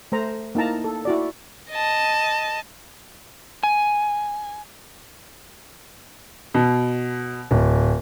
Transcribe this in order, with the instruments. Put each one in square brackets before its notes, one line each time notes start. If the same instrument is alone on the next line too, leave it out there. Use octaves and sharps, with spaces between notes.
[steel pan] A3 C5 A#5
A#3 D#4 E4 A5 A#5
A4
E4 F#4 D5
[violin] D#5 A5
[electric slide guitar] G#5
[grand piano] B2
D1